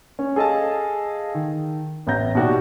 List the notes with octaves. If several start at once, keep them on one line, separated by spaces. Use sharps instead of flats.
C#4
G#4 A4 D#5 F5 A5
D#3
A1 B3 E5 A#5 G6 A#6
B2 D#4 F#4 G4 D5